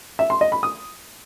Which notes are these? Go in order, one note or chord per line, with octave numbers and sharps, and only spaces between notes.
E5
C6
D#5
B5
D#6